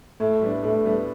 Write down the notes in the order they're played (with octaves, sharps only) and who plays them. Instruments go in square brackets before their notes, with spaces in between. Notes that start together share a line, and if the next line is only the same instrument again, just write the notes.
[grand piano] A2 [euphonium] A3
[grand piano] G3 B3 D4
[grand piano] A2 [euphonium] A3
[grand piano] G3 B3 D4